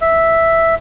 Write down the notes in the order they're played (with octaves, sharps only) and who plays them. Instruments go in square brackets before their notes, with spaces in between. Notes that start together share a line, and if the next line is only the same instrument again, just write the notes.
[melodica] E5